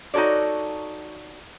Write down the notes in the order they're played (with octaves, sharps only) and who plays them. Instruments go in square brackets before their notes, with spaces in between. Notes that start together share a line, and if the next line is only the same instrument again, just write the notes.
[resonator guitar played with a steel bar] D#4 F#4 A4 C#5 D5